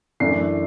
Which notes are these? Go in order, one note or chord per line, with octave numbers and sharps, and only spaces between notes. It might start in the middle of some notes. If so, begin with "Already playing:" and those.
F#2 E3 A3 D4 C7